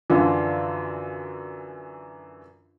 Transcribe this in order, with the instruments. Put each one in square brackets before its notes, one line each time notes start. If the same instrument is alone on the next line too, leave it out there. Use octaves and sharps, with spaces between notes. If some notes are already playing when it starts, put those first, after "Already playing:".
[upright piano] F#2 D3 E3 [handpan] D4 F4